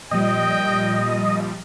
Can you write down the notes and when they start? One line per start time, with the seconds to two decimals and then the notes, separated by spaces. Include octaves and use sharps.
0.11 A#2 F3 G3 D#5 G5